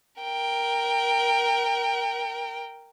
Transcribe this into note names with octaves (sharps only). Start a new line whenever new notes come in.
A#4 G5